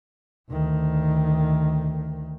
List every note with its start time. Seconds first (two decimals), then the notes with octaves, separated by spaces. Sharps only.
0.51 D2 D#3